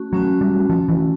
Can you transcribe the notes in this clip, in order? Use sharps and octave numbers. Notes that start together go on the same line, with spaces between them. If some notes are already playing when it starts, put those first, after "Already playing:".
Already playing: A3 C#4 F#4
F#3 A3 C#4 F#4
G3
F3 A3 C#4 F#4
E3